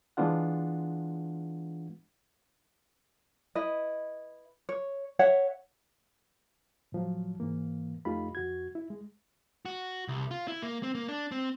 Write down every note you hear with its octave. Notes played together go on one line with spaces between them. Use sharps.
E3 G#3 B3 D4 F4 F#5
E4 B4 D#5
C#5
C#5 E5 F#5
A2 F3 F#3
G#2 E3 A#3
F2 A3 D#4 F4 G4 B5
F2 F#4 G#6
E4
G#3
F#4
C2
F4
E4
A#3
C4
A#3
D4
C4